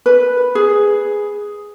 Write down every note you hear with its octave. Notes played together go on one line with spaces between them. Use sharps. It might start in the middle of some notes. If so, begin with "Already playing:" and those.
B4
G#4